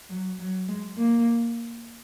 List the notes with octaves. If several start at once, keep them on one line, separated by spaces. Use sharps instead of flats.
F#3
F#3
G#3
A#3